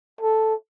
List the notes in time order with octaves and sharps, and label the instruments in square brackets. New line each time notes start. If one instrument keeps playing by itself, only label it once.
[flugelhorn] A4